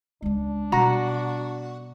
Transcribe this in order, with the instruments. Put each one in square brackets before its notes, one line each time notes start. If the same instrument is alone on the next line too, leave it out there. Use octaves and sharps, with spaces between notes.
[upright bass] C#2 G#3 [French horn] D4
[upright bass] B2 G3 [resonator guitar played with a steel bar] F#4 [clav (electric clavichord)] A#5